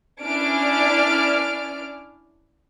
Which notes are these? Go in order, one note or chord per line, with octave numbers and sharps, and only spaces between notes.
C#4 D4 E4 D5 F6 D7